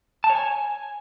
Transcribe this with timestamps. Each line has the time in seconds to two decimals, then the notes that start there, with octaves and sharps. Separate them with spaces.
0.24 A5
0.30 C#5
0.35 G#5